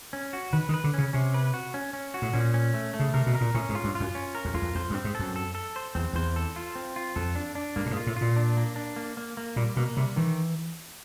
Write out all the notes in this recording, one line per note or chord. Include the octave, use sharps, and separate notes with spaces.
C#4
F#4
D#3 B4
D#3
B4
D3
C#3 C#4
C3 C#4
B4
F#4
C#4
C#4
F#4
A2
A#2 C#4
C#4
A3
A3
C#3
C3 A#4
B2
A#4
A#2
A2 C#4
G#2
F4
G2
F4
F#2
C#4
A#4
F2
E2 F4
F2
F2 C5
G2
C4
G#2
F#2 A4
A4
A4
C5
E2 C4
E2 C5
A4
F4
C4
F4
F2 A4
D4
D4
G2 A#3
A2
G#2
F4
A2
A#2 F4
D4
A#3
D4
A#3
A#3
A#3
A#2 G3
B2 A#3
C3 G3
D#3 E3